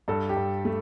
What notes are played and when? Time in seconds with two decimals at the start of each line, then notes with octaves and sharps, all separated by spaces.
0.08 G2 A4
0.29 G4
0.36 G2
0.65 A3